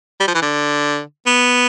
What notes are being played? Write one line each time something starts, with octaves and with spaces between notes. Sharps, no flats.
G3
F3
E3
D3
B3